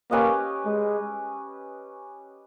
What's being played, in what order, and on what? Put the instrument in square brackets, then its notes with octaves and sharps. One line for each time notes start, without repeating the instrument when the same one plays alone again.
[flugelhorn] A#3 [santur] C#4 G4 B4 D#5
[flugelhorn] G#3